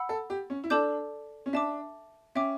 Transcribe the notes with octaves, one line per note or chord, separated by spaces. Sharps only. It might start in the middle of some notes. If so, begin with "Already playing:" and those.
Already playing: F#5 B5 E6
A4
G4
C#4
E4
D4 A4 D5 A5 D6 G6
C#4
D4 E5 A5 D6
C#4 E5 G5 D6